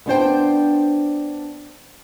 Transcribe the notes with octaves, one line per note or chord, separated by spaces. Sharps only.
B3 D4 C5 G5